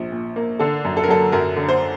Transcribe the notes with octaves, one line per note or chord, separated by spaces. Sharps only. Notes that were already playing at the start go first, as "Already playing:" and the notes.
Already playing: A#1 F3
A#2
A#3
D3 A4
F#2
A4
A#4
F#3 A4
F#2 A#4
D3
C5